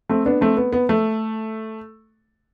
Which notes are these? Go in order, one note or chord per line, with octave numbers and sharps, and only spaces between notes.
A3 C4
B3 D4
A3 C4
B3
B3
A3